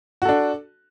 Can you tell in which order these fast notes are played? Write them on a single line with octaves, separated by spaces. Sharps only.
F#4 A4 D4